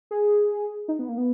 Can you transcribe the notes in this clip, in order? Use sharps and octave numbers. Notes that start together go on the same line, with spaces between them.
G#4
D#4
B3
A#3
B3